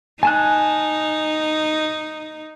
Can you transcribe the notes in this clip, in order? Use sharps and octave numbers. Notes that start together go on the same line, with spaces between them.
D#4 G#5 A5 F#6